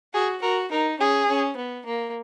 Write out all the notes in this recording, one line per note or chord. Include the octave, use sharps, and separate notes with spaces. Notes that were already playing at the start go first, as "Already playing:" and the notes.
F#4 G#4
F#4 A#4
D#4 A#4
C#4 G#4
C#4
B3
A#3